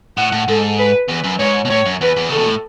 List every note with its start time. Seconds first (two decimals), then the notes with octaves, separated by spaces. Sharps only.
0.17 A2 F#5
0.32 A2
0.48 G#2 A4
0.79 B4
1.09 E2 B4
1.24 F#2
1.39 G#2 C#5
1.65 B2
1.70 A2 C#5
1.86 F#2
2.01 E2 B4
2.17 E2
2.29 C#3 A4
2.38 B2
2.46 A2